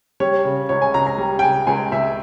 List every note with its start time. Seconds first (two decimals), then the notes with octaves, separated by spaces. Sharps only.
0.20 G3 C#5
0.45 C#3
0.69 C#2 C#5
0.82 G#5
0.94 C#2 A#5
1.07 A#5
1.18 G3
1.39 G5
1.42 C#3 G#5
1.67 C#2 G#5
1.92 C#2 E5